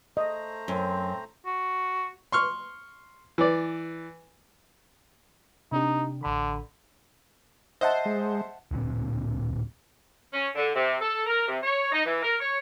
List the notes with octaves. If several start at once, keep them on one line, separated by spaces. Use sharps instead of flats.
A3 C5 D#5 A#5
F#2 C4
F#4
C6 C#6 F6
E3 D5
C3 D4 D#4 G4
A1 D3 B5
C5 D#5 E5 F#5 A5
G#3
D1 A#2 D3 C4
C#4
D3
C3
A4
A#4
C3
C#5
D#4
E3
A#4
C#5